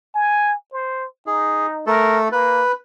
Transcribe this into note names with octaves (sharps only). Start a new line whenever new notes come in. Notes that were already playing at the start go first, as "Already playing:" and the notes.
G#5
C5
D#4 G#4
A3 A4 A#4
A#3 B4